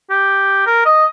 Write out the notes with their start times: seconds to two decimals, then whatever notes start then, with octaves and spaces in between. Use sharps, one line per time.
0.10 G4
0.67 A#4
0.86 D#5